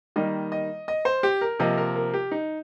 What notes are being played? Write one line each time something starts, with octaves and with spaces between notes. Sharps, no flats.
D#3 G3 A#3 D#5
D#5
D#5
C5
G4
A#4
C3 F3 A#3 D#5
A#4
A#4
G4
D#4